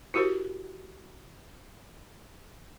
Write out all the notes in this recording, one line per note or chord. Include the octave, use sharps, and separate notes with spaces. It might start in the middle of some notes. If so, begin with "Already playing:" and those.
E4 F#4 G4 A#4 C5